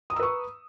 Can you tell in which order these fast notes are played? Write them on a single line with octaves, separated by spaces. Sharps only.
D#6 A#5 E6 B4 C#6